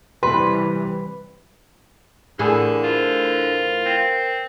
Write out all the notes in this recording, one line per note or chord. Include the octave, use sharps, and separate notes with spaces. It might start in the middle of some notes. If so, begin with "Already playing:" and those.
C3 E3 G3 B4 C6
A2 D3 E3 G#4 A#4 D5 F#5
F4 A#4 C5
C4